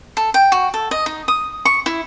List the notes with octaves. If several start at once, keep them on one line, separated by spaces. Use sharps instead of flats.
A4
G5
F#4
A4
D#5
D#4
D#6
C#6
E4